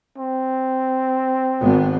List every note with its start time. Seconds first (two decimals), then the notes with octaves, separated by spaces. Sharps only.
0.18 C4
1.61 G#1 B3